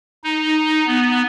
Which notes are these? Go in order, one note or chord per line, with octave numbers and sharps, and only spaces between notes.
D#4
B3